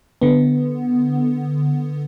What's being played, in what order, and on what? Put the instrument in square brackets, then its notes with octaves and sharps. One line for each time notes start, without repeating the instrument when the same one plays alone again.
[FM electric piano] D3 B3